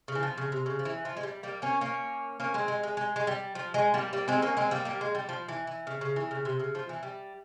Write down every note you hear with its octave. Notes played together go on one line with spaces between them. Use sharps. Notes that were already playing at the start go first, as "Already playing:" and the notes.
C#3
E3
F3
C#3
C3
C#3
F3
E3
F3
G#3
G3
G3 A#3
A#3 C#4
A#3 C#4
A#3 C#4
G#3 C4
G#3
G#3
G#3
G#3
G3
F3
G#3
G3 A#3
G3 A#3
G#3 C4
A#3 C#4
G#3 C4
G3 A#3
G3 A#3
G#3
G3
F3
E3
E3
C#3
C#3
E3
C#3
C3
C#3
F3
E3
G3